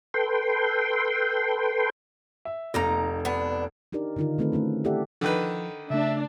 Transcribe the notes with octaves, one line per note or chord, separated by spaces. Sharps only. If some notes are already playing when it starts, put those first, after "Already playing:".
A4 B4 G5 C6
E5
F1 A#3 D#4 A#5
B3 D4
D4 D#4 G4 A#4 D5
D3 D#3 D#4 F4 A#4
D#3 A3 C4 F4 A4 B4
A3 C#4 E4 F#4
E4 G4 A4 D5 E5 F#5
D3 D#3 F3 B4
C#3 A3 D4 E5